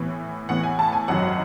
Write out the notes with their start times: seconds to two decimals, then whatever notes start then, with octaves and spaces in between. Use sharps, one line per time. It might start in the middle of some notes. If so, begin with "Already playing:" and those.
Already playing: A2 E3 B3
0.49 A2 E3 B3 F#5
0.63 G#5
0.79 A5
0.93 G#5
1.08 G#1 F#2 D#3 F#3 F#5